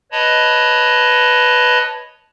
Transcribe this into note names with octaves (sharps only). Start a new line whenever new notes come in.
B4 C#5 D#5 A5 B5